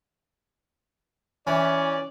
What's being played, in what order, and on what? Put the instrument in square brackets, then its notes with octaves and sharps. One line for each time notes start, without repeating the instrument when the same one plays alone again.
[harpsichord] E3 [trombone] C#4 [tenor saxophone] D5